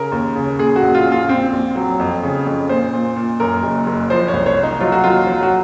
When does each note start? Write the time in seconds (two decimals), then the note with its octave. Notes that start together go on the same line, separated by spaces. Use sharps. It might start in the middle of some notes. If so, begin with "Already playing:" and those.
Already playing: C#3 A#4
0.12 D#2
0.36 C#3
0.59 A#2 G#4
0.76 F#4
0.82 A#1
0.95 F4
1.05 A#2
1.12 F4
1.29 A#1 C4
1.53 A#1
1.76 F#3
2.00 F2
2.23 C#3
2.47 F2
2.69 A#2 C5
2.93 A#2
3.16 A#2
3.40 F#2 A#4
3.63 F#1
3.87 F#1
4.10 F3 C5
4.28 C#5
4.33 C2
4.46 C#5
4.57 A#2
4.63 D#4
4.80 F#3 F4
4.92 F#4
5.04 D#2 F4
5.27 F#3
5.43 F#4